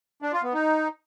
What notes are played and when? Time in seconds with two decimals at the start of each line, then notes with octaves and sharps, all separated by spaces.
0.22 D4
0.33 F4
0.43 B3
0.53 D#4